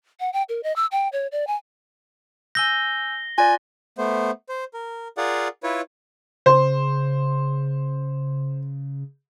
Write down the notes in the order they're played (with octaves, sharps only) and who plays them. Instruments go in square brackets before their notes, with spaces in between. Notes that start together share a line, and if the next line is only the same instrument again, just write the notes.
[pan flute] F#5
G5
A#4
D#5
E6
G5
C#5
D5
G#5
[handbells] G#5 E6 G6 [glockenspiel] A#6 G7
[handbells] F4 D5 [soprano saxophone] G#5
[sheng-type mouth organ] A3 B3 C5
C5
A#4
F4 G#4 A#4 D5 F5 F#5
E4 F4 B4 C#5
[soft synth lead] C#3 [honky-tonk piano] C5